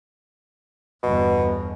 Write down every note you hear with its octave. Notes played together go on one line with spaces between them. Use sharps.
G1 E2 B2